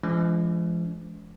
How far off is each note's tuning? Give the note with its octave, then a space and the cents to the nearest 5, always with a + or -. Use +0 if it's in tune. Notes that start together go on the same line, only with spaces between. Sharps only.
F3 -40 G#3 +15 C#4 +40